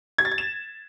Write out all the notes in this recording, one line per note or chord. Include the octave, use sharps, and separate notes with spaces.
G#6
A6
G#6
E7